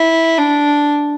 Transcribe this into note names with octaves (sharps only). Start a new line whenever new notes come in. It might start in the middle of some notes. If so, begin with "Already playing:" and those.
Already playing: E4
D4